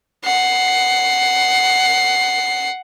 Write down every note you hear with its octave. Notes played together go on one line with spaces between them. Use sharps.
F#5 C7